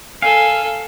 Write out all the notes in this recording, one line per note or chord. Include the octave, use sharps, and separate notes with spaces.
A4 F5 G#5